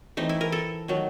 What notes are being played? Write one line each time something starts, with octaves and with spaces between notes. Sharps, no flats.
E3 A3 C4 D#4
E4
A#4
A4
D#3 F#3 A3